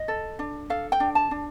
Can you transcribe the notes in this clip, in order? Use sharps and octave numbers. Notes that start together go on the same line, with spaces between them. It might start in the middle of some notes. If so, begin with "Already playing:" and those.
Already playing: D#5
A4
D4
A4 F5
G5
D4
A5
D4